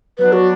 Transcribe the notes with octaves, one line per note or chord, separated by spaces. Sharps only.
F#3 B3 D4 B4
F#4